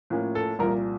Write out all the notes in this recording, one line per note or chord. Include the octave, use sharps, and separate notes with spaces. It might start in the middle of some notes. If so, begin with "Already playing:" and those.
A2 F3 A#3 C#4
A4
C2 A#2 F3 A#4